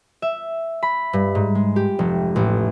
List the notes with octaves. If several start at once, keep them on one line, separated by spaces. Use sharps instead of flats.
E5
B5
G2
G#2
G#3
G4
F1
A1